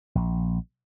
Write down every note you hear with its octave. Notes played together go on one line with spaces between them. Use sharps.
A#1